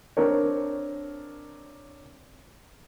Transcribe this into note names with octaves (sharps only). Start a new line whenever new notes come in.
C4 D4 A#4 C#5